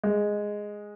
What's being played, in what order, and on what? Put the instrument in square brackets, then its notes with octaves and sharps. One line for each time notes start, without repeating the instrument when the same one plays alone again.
[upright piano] G#3